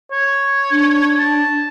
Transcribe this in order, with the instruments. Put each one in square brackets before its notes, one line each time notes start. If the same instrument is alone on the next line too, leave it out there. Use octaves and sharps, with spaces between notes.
[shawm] C#5
[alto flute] D4
[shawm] A5